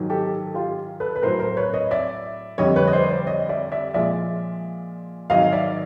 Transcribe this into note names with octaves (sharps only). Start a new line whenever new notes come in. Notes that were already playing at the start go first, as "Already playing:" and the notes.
Already playing: G#2 D#3 F#3
G4 A4
F4 G4
A4 B4
B4
A2 F#3 A#4 C5
A#4 C5
B4 C#5
C#5 D#5
D5 E5
F2 D3 G3 C#5 D#5
B4 C#5
D#5
C5 D5
C5 D5
C#5 D#5
D5 E5
D5 E5
A#2 F3 G#3 D5 E5
G#2 D#3 F#3 D#5 F5
D5 E5